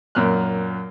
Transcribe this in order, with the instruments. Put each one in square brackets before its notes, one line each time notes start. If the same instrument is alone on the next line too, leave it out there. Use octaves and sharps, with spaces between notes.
[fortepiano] F#2 A#2 F6 F#6